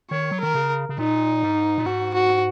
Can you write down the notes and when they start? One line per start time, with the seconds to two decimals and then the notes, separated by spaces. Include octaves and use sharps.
0.11 D#3 C#5
0.31 F#3
0.41 D#3 A#4
0.55 C#3
0.89 C#3
0.98 A#2 D#4
1.43 G#2
1.78 A#2
1.86 G#2 F#4
2.15 F#4